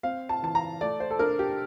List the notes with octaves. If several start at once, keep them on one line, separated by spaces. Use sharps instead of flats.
C4 F5
A5
E3 A5
A#5
A3 D5
C5
A4
D4 A#4
G4